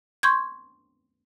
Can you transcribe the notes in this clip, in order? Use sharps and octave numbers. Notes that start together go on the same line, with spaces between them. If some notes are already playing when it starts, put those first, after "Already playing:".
C6 C#6 G6 G#6